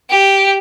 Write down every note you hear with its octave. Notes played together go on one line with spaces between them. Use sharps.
G4